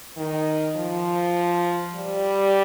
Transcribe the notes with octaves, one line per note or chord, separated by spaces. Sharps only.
D#3
F3
G3